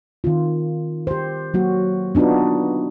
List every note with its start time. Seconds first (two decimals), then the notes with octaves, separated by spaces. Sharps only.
0.24 D#3 C4 F4
1.07 G4 C5
1.54 F#3 A#3 F#4
2.15 B3 D4 D#4 F4 F#4